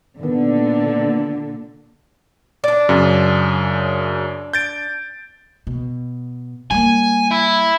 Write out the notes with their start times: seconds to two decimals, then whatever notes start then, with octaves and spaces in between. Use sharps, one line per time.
0.19 A#2 D3 D#3 B3
2.64 D4 D5
2.89 F#2 C#3
4.53 G6 A6 D7
5.67 B2
6.71 G3 A#3 G#5
7.32 E4